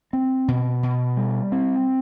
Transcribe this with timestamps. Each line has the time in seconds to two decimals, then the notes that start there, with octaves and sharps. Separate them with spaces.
0.13 C4
0.48 B2
0.83 B2
1.17 G3
1.52 C4